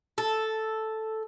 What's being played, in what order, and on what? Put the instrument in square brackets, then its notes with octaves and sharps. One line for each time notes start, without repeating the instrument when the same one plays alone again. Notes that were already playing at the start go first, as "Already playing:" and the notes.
[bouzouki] A4